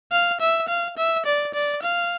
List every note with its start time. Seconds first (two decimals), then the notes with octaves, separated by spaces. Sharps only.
0.12 F5
0.40 E5
0.68 F5
0.97 E5
1.26 D5
1.54 D5
1.83 F5